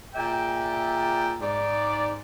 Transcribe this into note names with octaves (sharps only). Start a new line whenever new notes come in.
A#2 G#4 D5 E5 G5
G#2 D5